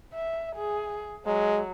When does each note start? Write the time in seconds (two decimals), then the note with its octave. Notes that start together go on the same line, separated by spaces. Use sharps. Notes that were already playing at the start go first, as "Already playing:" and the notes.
0.13 E5
0.55 G#4
1.26 F#3 G#3